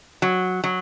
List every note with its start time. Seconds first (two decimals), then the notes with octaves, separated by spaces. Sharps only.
0.22 F#3
0.64 F#3